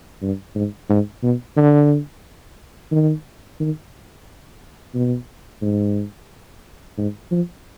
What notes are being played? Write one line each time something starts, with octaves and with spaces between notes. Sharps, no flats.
G2
G#2
G#2
B2
D3
D#3
D#3
B2
G#2
G#2
F3